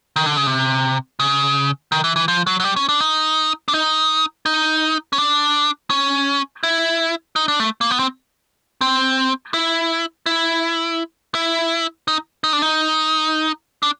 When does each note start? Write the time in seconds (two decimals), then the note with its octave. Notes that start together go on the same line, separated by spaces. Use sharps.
0.16 D#3
0.26 D3
0.37 C#3
0.47 C3
1.20 C#3
1.92 D#3
2.04 E3
2.16 E3
2.28 F3
2.47 F#3
2.60 F#3
2.64 G3
2.76 C#4
2.89 D4
3.00 D#4
3.68 D4
3.73 D#4
4.46 D#4
5.13 C#4
5.18 D4
5.90 C#4
6.63 E4
7.36 D#4
7.48 D4
7.60 A3
7.81 A#3
7.91 B3
7.99 C4
8.81 C4
9.54 E4
10.26 E4
11.35 E4
12.08 D#4
12.44 D#4
12.53 D4
12.62 D#4
13.83 D4